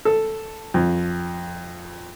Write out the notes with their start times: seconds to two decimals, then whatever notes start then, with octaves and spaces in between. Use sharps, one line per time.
0.05 A4
0.74 F2